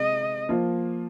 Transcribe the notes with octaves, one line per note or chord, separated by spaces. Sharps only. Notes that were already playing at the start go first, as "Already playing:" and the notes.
Already playing: C3 G#3 D#5
F3 A#3 F4